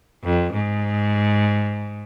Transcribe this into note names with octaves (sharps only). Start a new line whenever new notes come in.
F2
G#2